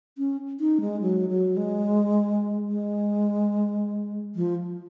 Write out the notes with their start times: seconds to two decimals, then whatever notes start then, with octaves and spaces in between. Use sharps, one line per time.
0.18 C#4
0.60 D#4
0.81 G#3
1.01 F#3
1.29 F#3
1.57 G#3
2.68 G#3
4.35 F3